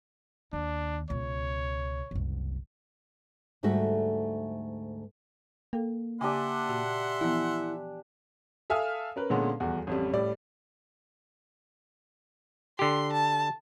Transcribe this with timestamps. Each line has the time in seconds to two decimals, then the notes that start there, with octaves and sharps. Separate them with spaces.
0.53 D#2 D4
1.10 C#2 B2 C#5
2.11 F#1 C2
3.63 D2 G#2 G3 A3 F#4 E5
5.73 A#3 A4 F5 G5
6.21 C#3 D4 G4 E5 F#5 G#5 C6 D6
6.68 A#2 F#4 D6
7.21 E3 F3 B3 E4
8.70 A4 E5 F5 G#5 D#6 F6
9.16 C#4 A#4 B4
9.30 A#2 D3 G#3 B3 C#4
9.60 D#1 E2 F#4
9.87 A1 F2 G3
10.13 A2 G3 D5
12.79 D3 G4 C6
13.13 A5